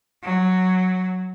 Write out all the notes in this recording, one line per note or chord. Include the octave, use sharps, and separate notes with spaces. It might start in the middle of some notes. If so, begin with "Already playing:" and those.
F#3